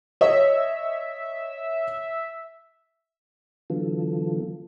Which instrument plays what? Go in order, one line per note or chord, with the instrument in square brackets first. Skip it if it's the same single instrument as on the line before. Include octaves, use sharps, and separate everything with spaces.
[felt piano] C#5 D#5 [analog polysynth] E5
[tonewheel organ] D3 E3 F#3 B3 F4 A4